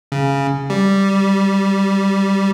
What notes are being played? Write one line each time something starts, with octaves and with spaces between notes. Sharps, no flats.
C#3
G3